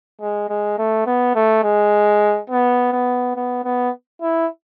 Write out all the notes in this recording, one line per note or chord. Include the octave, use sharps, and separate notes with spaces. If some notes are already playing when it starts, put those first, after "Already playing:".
G#3
G#3
A3
B3
A3
G#3
B3
B3
B3
B3
E4